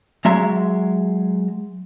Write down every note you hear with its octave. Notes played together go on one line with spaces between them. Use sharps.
F#3 G#3 E5 A#5